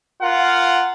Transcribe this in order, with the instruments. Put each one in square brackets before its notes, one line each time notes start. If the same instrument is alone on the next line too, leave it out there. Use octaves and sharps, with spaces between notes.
[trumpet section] F4 A#4 F5 F#5